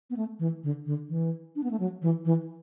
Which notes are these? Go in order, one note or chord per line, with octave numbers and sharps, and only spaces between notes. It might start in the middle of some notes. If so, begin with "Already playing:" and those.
B3
A3
E3
D3
D3
E3
D4
B3
A3
F#3
E3
E3